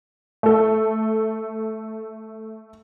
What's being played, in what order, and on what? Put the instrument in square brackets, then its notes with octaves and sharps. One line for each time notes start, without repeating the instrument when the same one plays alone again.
[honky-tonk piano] A3 A4